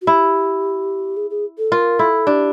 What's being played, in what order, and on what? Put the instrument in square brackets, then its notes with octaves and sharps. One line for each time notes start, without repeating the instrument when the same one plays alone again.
[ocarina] F#4
[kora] E4 [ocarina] G4
[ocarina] G#4
G#4
A4
[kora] F4 [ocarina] A#4
[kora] E4 [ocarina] A4
[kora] D4 [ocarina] G4